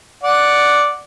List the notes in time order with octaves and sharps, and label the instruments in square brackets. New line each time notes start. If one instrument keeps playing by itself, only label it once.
[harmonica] D5 F#5